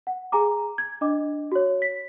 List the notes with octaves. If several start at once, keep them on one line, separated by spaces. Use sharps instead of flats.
F#5
G#4 G#5 A#5 D6
G#6
D4 D#5 D6
F#4 C#5
B6